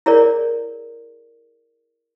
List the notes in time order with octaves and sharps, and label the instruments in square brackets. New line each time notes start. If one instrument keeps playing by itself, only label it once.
[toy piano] E4 G#4 A#4 C#5 D5